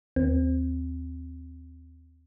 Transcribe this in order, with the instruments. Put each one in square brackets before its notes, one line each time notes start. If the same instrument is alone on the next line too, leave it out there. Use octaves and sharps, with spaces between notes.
[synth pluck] D#2 C4